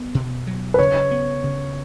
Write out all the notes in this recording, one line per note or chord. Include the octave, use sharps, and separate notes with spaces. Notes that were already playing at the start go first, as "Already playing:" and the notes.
Already playing: B3
B2
F#3
B4
C#3 C#5
B3
C#3